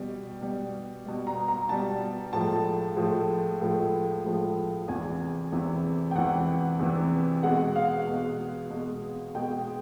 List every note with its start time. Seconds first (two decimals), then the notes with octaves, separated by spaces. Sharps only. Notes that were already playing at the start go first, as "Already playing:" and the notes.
Already playing: B2 G3
0.42 B2 G3
1.06 B2 G3
1.27 A#5
1.48 A#5
1.69 B2 G3 A5
2.33 A2 F3 G#3 A5
2.96 A2 F3 G#3
3.61 A2 F3 G#3
4.24 A2 F3 G#3
4.88 E2 C3 E3 G#5
5.52 E2 C3 E3
6.11 G5
6.15 E2 C3 E3 F#5
6.79 E2 C3 E3
7.43 B2 G#3 F#5
7.76 F5
8.07 B2 G#3
8.70 B2 G#3
9.35 B2 G#3 G5